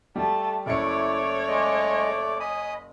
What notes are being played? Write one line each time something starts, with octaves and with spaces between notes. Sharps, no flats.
G3 A3 A5
F#1 A3 E4 C#5 D5 D6 C#7
G#3 D#5
D#5 G#5 B5 D#6